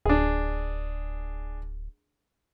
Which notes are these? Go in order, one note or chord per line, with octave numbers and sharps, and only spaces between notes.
D1 D4 G#4